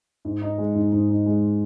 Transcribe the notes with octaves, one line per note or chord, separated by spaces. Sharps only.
G#2
D#4
G#3
G#2
G#2
D#4
G#3